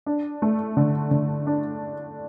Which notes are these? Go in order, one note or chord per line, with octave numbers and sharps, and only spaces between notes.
D4
A3
D3
D3
D4